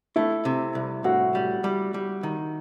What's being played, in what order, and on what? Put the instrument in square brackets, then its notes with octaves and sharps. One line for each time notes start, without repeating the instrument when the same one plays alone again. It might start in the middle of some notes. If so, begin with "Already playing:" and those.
[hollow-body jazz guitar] A3 [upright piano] E4
[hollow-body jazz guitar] C3
C2
[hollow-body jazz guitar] A2 [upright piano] F#4
[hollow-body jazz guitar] G3
G3
G3
D#3